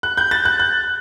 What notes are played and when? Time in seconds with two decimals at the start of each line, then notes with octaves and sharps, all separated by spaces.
0.03 F#6
0.17 G6
0.31 A6
0.45 F#6
0.60 F#6